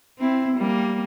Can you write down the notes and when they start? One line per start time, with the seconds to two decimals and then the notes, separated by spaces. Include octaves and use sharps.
0.19 C4 E4
0.56 G3 A#3